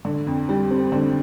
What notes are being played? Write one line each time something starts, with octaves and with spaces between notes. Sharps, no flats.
D3
F2
G3
C4
D3